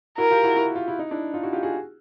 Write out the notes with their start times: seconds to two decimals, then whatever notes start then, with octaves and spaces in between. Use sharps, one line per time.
0.18 E4 F#4 A#4
0.31 F4 G4
0.44 E4 F#4
0.56 E4 F#4
0.76 F4
0.88 E4
0.99 D#4
1.11 D4 E4
1.34 D#4 F4
1.43 E4 F#4
1.53 F4 G4
1.63 F#4 G#4